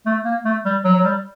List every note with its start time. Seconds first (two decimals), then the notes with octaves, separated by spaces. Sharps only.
0.06 A3
0.25 A#3
0.45 A3
0.65 G3
0.84 F#3
0.95 F#3
1.04 G3